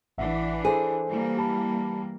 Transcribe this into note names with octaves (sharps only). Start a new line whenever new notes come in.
A1 E3 D4 E5 F#5
G#4 A4 C5
E3 G3 A#3
G4 A5 B5